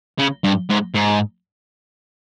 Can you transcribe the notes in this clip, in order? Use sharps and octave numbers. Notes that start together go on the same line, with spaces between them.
C#3
G2
G#2
G#2